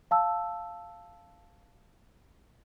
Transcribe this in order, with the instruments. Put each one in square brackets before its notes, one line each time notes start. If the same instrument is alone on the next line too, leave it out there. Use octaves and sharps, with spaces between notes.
[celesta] F5 A5 E6